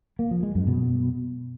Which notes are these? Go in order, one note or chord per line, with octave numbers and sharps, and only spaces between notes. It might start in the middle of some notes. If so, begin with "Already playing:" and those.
A#3
F3
G#3
F#2
B2